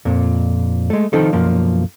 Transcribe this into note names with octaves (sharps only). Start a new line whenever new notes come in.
F2 A#2
G#3 A3
D#3 F3 C4 D#4 F4 A4
B1 F#2 F3 A#3